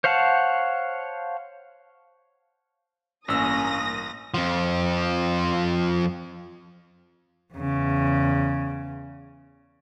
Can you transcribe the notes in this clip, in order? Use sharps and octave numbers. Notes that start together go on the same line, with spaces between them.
C5 C#5 F5 F#5 A5
A1 G2 A#3 C#4 D#6 E6 A#6
F2 F3
E2 C#3